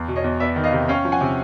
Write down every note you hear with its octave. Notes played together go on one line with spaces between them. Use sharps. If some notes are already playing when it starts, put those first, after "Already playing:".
Already playing: E2
B2
C#5 D#5
E2
B3 D5 E5
D#3
D#5 F5
C3
C#4 F5 G5
F3
F#5 G#5
C3